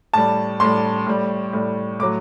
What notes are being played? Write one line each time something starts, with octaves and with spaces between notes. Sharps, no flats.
A2 G3 A5
A2 G3 C6
A2 G3
A2 G3
A2 F#3 D6